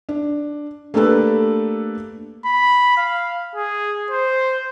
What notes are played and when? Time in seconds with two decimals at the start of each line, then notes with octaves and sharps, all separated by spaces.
0.09 D4
0.94 A3 A#3 D4 G4 A4 B4
2.46 B5
2.97 F5
3.55 G#4
4.11 C5